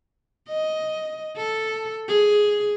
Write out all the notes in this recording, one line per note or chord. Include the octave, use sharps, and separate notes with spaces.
D#5
A4
G#4